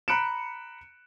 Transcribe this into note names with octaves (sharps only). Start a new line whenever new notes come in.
A#5 B5 F#6 C#7 D7 E7